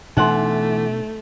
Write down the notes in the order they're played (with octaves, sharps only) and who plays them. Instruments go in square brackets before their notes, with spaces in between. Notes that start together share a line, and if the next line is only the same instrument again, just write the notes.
[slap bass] B2 D4 [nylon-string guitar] E3 F#5 [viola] A3 [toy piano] D#4 C6